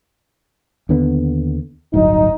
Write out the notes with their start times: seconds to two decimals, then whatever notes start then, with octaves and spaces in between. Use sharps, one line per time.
0.89 D#2 D3 B3
1.94 D1 G1 F#3 D#4